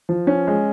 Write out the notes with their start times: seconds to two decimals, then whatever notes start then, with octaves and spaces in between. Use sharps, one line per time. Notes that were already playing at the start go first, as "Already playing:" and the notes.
0.09 F3
0.27 C#4
0.47 G#3